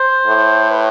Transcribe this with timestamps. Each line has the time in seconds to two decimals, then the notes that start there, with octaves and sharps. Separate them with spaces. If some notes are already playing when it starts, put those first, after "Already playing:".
Already playing: C5
0.27 A2
0.71 B4